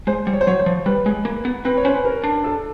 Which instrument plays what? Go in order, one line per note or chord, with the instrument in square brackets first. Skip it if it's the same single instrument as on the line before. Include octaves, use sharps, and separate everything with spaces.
[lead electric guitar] G#3 [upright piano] C5
[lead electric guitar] G3
[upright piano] C#5
C5
[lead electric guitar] F#3 [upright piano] C#5
[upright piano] C5
[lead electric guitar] F3
[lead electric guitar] G3 [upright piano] B4
[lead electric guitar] G#3
A#3
B3
[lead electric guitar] C4 [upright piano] B4
[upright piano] C#5
[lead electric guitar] C#4 [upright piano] C5
[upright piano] B4
A#4
[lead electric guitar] D4
[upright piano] A4